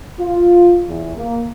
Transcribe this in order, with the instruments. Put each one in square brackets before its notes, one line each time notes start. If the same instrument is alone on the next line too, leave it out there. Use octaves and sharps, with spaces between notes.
[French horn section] F4
E2
A#3